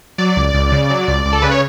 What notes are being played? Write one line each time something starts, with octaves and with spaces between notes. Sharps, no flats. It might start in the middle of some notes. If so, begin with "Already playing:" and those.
F#3 D5
C#2
C#2
C#3
F#3
C#2
C#2
A4
C#3 B4
C#5